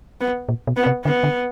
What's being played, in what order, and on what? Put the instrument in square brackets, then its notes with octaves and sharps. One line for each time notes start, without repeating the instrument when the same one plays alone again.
[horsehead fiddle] B3
[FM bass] A#2
B2
[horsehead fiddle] B3
[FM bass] C3
[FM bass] D3 [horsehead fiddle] B3
[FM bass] D3